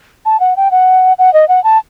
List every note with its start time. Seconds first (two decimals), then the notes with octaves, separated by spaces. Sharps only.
0.25 A5
0.40 F#5
0.57 G5
0.71 F#5
1.19 F#5
1.34 D#5
1.48 F#5
1.64 A5